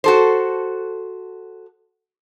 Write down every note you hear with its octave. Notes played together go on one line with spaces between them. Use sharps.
F#4 A4 C5